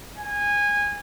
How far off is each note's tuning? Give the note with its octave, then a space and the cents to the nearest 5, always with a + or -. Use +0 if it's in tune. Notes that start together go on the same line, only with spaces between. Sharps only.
G#5 -20